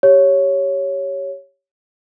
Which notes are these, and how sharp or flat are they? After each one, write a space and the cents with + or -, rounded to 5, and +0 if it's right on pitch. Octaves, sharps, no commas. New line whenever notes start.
G4 +0 C#5 +0